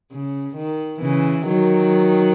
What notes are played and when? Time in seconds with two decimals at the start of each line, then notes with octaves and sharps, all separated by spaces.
0.12 C#3
0.57 D#3
1.01 C#3 E3
1.46 D#3 F#3